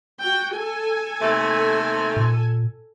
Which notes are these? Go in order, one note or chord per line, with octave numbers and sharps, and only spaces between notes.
F#4 G5
A4 G#5
D#2 C3 A3
A#2